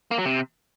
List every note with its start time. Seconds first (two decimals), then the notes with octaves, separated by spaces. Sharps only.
0.11 A#3
0.18 F#3
0.25 C3